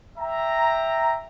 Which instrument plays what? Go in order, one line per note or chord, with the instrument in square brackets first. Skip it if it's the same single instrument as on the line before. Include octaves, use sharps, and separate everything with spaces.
[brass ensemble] E5 G5 A#5